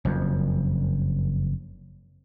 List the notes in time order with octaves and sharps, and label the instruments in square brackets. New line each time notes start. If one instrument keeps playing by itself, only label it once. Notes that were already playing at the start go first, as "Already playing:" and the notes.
[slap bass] F#1 F2